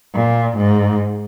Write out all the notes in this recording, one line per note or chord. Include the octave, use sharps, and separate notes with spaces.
A#2
G#2